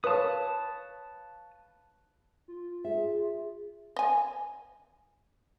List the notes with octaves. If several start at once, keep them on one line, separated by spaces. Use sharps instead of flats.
B4 C#5 F5 A5 D#6
F4
G#4 E5
D#5 G#5